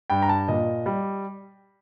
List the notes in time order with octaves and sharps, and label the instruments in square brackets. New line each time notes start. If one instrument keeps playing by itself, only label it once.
[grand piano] G2 G5
A#5
A5
A#2 D#5
G3